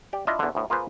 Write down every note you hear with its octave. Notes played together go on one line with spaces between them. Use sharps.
G4 D5
D4 E4 F4 D#5 E5
E2 D3
D2 A2
A#3 F4 G#4 B4 C5